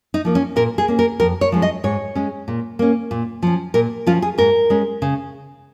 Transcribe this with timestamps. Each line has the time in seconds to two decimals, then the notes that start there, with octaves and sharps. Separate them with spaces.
0.14 D#4
0.25 F3 A#3
0.35 C#4
0.56 A#2 A#4
0.78 G#4
0.88 A#3 C#4
0.99 A#4
1.20 F2 A#4
1.41 C#5
1.52 F3 G#3 C#4
1.62 D#5
1.84 G#2 C#5
2.15 G#3 C#4
2.48 A#2
2.79 A#3 C#4
3.11 A#2
3.43 F3 C#4
3.74 A#2 A#4
4.07 F3 C#4 F4
4.22 G#4
4.38 G#2 A#4
4.70 G#3 C#4
5.02 C#3